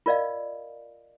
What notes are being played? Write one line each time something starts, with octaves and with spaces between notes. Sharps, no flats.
F4 A#4 D5 D#5 F5